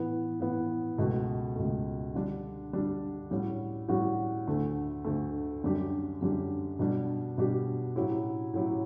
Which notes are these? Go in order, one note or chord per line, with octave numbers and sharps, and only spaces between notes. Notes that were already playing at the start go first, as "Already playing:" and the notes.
Already playing: A2 E3 B3
A2 E3 B3
C#2 B2 A3
C#2 B2 A3
D3 G3 D4
D3 G3 D4
A2 G3 C#4 F#4
A2 G3 C#4 F#4
D2 D3 A3
D2 D3 A3
F#2 D3 G3 D4 G4
F#2 D3 G3 D4 G4
B2 G3 D4 G4
B2 G3 D4 G4
A2 F#3 C#4 E4 G4
A2 F#3 C#4 E4 G4